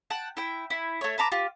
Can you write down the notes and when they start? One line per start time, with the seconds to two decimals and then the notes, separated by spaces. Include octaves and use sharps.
0.10 F#5 G5 A5
0.37 E4 G5
0.70 E4
1.01 A3 C#5
1.18 B4 A5 A#5 D6
1.32 F4 G4